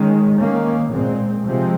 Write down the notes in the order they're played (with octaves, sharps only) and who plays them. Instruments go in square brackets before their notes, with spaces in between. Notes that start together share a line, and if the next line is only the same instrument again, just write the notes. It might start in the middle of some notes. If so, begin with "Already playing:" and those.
Already playing: [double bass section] D#3 G#3 C#4
D#3 A#3 C#4
A#2 G#3 C4
C3 F3 G#3 C4